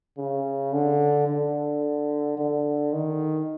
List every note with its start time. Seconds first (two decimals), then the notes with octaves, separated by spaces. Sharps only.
0.18 C#3
0.73 D3
1.27 D3
2.37 D3
2.93 D#3